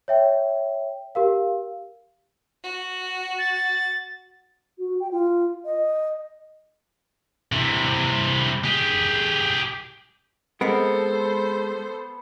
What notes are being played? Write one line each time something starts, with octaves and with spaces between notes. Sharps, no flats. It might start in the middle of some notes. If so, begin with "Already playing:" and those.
C#5 E5 G5
G4 A#4 F5
F#4
A6
F#4
G5
F4
D#5
C3 E3
G4 G#4
G#3 B3 C4 A4 A#4 C5